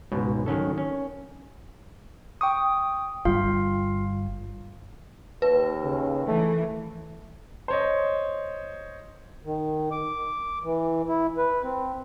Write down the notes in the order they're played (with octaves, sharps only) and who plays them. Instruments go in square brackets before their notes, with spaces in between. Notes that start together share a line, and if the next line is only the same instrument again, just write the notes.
[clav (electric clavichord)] C#2 G#2 B2
D#3 F#3 C#4 A4
C#4
[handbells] G5 C#6 D#6
[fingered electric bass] G1 G3 [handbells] F4 F5
[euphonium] D#2 [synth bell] B4
[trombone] C#3
[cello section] E3 [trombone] A3
[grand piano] C5 C#5 D#5
[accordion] D#3
D6
E3
E4
B4
C4